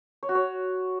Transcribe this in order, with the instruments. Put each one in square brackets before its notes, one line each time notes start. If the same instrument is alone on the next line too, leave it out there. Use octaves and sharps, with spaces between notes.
[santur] C#5
F#4
C#5